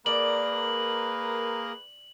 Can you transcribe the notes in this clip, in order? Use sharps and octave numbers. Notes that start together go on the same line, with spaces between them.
A#3 G#4 A#4 B4 D5 F#7